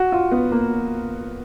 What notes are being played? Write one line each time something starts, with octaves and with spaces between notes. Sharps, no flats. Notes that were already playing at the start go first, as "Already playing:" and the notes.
Already playing: F#4
F4
B3
A#3